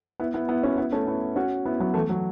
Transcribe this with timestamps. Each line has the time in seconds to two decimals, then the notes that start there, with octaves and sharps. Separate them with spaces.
0.20 B3 E4
0.34 B3 E4
0.49 B3 E4
0.63 C#4 F#4
0.78 B3 E4
0.92 A3 C#4
1.07 B3 E4
1.36 C#4 F#4
1.66 B3 E4
1.80 F#3 B3
1.94 E3 A3
2.09 F#3